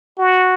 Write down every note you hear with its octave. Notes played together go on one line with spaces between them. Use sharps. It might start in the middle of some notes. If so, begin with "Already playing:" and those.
F#4